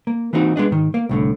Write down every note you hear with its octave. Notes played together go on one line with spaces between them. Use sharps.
A#3
E3 A#3 C4 D#4 F#4
G#3 B3 D4 D#5
G#2 D#3
A#3
C2 A2 D3